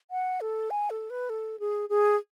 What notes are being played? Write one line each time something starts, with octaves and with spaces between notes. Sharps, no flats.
F#5
A4
G#5
A4
B4
A4
G#4
G#4